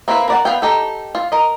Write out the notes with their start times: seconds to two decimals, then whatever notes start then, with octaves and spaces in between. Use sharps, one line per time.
0.08 A#3 C4 E4 F#4 B4
0.28 A#4 D5 F#5
0.45 B3 F5 G5
0.62 D#4 G4 A4
1.15 F4
1.32 A#4 D#5